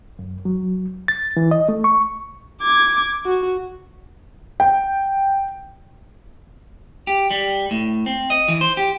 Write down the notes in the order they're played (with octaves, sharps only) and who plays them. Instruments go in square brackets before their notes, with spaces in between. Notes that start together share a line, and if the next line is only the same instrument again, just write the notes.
[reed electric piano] F#2
F#3
A6
E3
D#5
A3
C#6
[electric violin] D6 G#6
F#4
[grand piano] G5
[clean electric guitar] G4
G3
A2
C4
D#5
E3
C5
G4